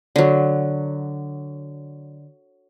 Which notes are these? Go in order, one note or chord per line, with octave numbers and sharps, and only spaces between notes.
D3 F#3